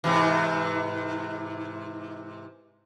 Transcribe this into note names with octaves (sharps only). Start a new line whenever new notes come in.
G#2 C3 E3